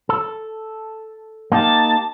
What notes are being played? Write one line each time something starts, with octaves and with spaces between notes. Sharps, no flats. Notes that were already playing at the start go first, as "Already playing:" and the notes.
A4
A#3 D#4 G4 A5